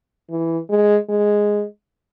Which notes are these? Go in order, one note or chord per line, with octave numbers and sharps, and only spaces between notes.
E3
G#3
G#3